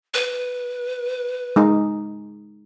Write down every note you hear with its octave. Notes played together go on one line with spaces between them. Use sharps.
B4
G#3 D#4